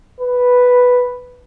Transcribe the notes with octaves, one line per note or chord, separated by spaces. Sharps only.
B4